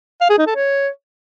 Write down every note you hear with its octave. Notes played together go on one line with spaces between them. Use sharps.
F5
G#4
D#4
A4
C#5